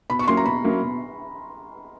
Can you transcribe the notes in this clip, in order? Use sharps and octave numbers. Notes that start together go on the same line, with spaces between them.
B2 B5
C#6
F#3 A#3 C#4 E4 C6
A#5
B2 B5
F#3 A#3 C#4 E4
B2